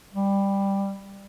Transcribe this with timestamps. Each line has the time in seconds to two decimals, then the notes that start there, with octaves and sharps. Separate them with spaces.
0.13 G3